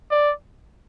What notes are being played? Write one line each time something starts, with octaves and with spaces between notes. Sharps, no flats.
D5